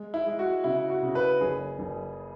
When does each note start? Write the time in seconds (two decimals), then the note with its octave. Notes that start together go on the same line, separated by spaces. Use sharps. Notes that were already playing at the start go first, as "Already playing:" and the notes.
Already playing: G#3
0.14 E4
0.26 G#3
0.39 F#4
0.64 C#3 E4
0.90 F#4
1.03 C#3
1.15 B4
1.41 F#1 G#4
1.79 F#1